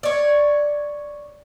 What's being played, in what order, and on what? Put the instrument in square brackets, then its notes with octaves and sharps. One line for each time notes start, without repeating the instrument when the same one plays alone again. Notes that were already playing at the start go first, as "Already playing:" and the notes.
[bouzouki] C#5 D5